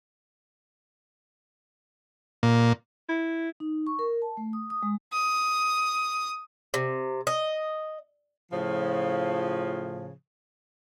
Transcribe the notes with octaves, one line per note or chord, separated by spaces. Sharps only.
A#2
E4
D#4
C#6
A#4
A5
A3
D#6
D#6
G#3
D#6
C3
D#5
A2 C#3 F3